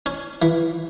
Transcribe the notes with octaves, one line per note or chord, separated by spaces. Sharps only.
C#4
E3